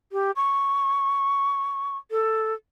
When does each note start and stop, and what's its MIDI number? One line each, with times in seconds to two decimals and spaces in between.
0.12 0.31 67
0.36 1.97 85
2.11 2.54 69